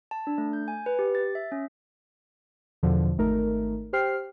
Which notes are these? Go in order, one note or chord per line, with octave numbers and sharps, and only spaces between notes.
A5
D4
A3
G6
G#5
B4
G4
A6
E5
C#4
E2 B2 D3 F3
G#1 A3 D#4 A#4
G4 C5 G5 F6 C7